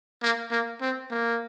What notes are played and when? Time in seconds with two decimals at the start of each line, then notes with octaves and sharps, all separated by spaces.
0.23 A#3
0.51 A#3
0.81 C4
1.11 A#3